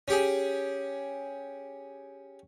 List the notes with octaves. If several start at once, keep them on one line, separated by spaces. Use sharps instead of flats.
C#4 G4 G#4